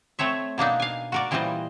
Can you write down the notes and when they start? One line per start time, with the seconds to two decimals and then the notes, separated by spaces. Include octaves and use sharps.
0.19 A3 C4 C#5 E5
0.58 B2 A#3 D4 D#4
0.80 F5 G#5
1.12 F#4 A#4 D5
1.31 A#2 E3 G3 F4 C5 D#5